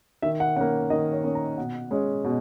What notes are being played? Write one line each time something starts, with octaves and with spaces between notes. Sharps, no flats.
D#3 E5
F#5
A#3 C#4 F#5
D#3 D#5
C#5
A#3 C#4
A#5
B2 F#5
G#3 C#4
B2